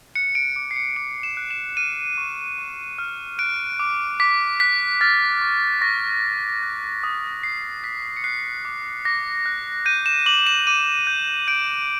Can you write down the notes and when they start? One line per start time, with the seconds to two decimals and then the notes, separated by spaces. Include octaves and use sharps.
0.15 F#6 C#7
0.35 D7
0.56 D6 D7
0.71 C7
0.76 C#7
0.96 D6 D7
1.23 E7
1.37 F#6
1.51 E7
1.77 F6 D#7
2.18 C#6
2.58 C#6
2.98 F6
3.39 F#6 D7
3.79 D6
4.20 D6 B6
4.60 F#6 B6
5.01 F6 A6
5.41 C#6
5.81 C#6 A#6
6.22 F6
6.63 F#6
7.04 D#6
7.43 D#6 C7
7.84 F#6 B6
8.17 C#7
8.24 F#6 C7
8.65 D6
9.05 D6 A#6
9.46 F#6
9.86 G6 D#7
10.06 E7
10.26 D6 F#7
10.47 E7
10.67 D6 D#7
11.07 G6
11.48 G6 D7